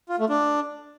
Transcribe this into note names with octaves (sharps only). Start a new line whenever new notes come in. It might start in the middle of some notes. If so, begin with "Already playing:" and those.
F4
A3
D4